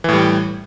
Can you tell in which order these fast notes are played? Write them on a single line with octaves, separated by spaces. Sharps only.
E3 A2 G3